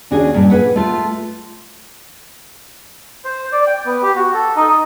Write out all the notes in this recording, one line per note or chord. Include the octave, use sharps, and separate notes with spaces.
D#2 C#3 D4 F#4 G#4
G2 A#2
G#4 A4 B4 F#5
A3 F4
C5
D5
G5
B3
G4
F#4
A4
D#4
D#5